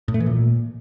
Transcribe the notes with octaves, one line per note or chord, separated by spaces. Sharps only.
A2
A3
E3
A#2